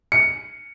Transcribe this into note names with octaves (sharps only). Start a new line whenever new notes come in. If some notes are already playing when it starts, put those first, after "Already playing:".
C#7